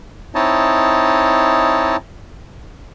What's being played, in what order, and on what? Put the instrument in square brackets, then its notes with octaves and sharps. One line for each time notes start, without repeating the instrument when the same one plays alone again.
[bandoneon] C4 D#4 E4 C#5 D#5 A5